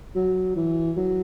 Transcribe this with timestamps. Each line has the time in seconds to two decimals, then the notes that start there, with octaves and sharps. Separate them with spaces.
0.16 F#3
0.56 E3
0.97 F#3